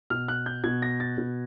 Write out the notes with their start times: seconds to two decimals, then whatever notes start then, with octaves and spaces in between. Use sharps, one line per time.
0.10 B2 F6
0.28 F#6
0.46 G6
0.64 B2 G#6
0.82 A#6
1.00 A6
1.18 B2